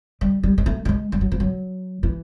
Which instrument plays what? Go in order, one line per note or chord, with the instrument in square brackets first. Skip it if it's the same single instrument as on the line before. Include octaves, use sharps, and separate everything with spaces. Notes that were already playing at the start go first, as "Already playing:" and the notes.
[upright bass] G3
G3
G#3
A3
G3
G#3
G3
F#3
F3
F#3
E3